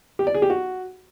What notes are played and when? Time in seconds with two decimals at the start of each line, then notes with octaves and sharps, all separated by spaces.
0.19 G4
0.27 D5
0.34 G#4
0.42 G4
0.50 F#4